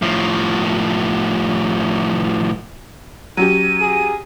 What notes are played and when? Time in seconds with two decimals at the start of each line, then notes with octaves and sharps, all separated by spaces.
0.02 A2 F3
3.37 F#3 C#4 G4 D#7
3.81 G#4